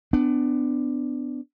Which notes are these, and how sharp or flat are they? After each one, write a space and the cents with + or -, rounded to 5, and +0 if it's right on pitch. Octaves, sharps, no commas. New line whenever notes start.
B3 +30 D4 +10